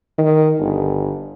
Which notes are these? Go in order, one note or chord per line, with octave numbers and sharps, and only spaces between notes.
D#3
G1